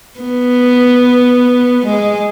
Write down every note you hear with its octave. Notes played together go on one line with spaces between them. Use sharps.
B3
G#3